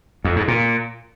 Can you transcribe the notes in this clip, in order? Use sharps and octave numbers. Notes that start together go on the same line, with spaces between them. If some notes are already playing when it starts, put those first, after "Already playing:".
F2
G#2
A#2